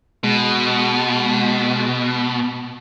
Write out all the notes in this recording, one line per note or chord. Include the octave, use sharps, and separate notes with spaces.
B2 G#3